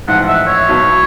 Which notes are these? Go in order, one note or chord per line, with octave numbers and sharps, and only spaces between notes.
A1 G#2 F3 F#5
E5
C#5
B1 B2 F#3 B3